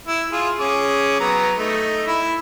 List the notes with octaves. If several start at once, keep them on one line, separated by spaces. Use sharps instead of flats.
E4
F4 G#4
C#4 G#4 D6
F#3 B3 A#5
A3 D#4
E4 B5